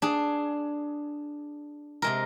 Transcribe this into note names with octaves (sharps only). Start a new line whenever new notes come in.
D4 G#4
C3 G#3 A#4